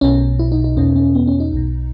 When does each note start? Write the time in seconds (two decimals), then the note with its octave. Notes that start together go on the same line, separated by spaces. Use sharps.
0.01 B1 B2 C#4
0.39 E4
0.52 D#4
0.64 D#4
0.77 E2 B2 C#4
0.96 C#4
1.15 B3
1.27 C#4
1.40 D#4
1.53 B1 B2